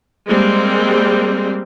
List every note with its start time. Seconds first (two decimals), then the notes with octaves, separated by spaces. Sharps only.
0.29 G3 G#3 A#3 C4